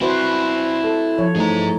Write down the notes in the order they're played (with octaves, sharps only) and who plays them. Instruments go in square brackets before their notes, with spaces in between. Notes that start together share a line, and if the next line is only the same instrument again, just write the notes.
[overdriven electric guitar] C4 E4 [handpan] F#4 B4 C5
[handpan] A4
F3 C#5
[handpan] E3 A3 D#4 [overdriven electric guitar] G#4 A#5